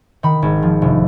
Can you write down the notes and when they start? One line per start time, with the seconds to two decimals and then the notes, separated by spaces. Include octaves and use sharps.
0.23 D#3 B5
0.42 G#1
0.62 F3
0.82 F1